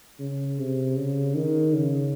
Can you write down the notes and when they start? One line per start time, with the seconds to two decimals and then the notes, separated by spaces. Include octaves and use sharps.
0.19 C#3
0.59 C3
0.96 C#3
1.35 D#3
1.74 C#3